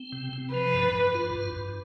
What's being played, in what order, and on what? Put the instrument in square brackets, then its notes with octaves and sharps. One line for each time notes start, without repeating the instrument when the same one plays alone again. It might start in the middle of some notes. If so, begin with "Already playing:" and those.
Already playing: [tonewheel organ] C4
C3
C3
[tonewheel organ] F3 [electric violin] B4
[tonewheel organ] G2
G2
F4
G2
G2